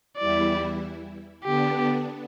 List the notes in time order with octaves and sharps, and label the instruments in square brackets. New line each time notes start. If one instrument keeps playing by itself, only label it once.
[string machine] E2 E3 G3 E4 [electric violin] D5
[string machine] D3 B3 D4 [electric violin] G4